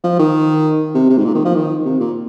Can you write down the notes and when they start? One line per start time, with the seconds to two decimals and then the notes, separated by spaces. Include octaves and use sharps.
0.04 F3
0.19 D#3
0.95 C3
1.10 C3
1.18 G#2
1.25 A#2
1.35 D#3
1.45 F3
1.55 D#3
1.85 C3
2.00 A#2